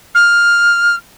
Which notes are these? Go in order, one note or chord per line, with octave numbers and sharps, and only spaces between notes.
F6